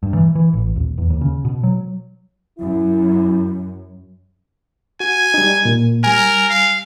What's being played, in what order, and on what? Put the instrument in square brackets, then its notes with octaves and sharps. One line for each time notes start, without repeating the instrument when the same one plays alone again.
[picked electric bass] G2
E3
E3
A1
D#1
E2
D#2
C#3
B2
F#3
[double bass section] F#2 [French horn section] E4
[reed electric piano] F#4 [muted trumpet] G#5
[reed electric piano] G3 D#4
A#2
[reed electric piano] G3 G#5 [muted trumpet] A#4
[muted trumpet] F5